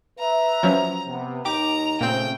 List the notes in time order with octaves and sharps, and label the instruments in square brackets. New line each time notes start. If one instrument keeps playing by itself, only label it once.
[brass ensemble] B4 E5 [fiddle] A#5
[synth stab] F3 F#3 C#4
[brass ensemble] C3 B3
[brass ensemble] D#2 D#4 [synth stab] G4 D6 [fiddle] A#5
[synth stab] A#2 C4 [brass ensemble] C#3 A3 [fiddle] G5